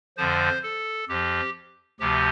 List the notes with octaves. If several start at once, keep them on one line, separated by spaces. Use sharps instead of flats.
F2 D3 F3 C5
A4
F2 F3 G4
D2 C3 F3 G4